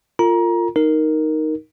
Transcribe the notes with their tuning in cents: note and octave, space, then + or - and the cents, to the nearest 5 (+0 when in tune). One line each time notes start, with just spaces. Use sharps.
F4 -5 A#4 -40 A#5 +25
D#4 +0 A#4 +0